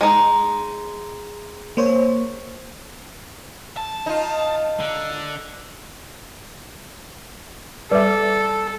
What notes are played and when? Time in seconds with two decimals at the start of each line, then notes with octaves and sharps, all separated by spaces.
0.01 G#3 D#4
1.77 A#3 C5 C#5
3.77 A5
4.06 D#4 F4
4.80 D3
7.92 G3 A4 B4 D5 E5